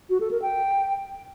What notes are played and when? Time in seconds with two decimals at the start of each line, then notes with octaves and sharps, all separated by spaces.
0.10 F#4
0.20 A4
0.31 A#4
0.42 G5